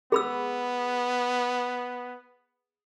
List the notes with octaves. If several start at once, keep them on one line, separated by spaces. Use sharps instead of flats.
B3 G#4 B5 E6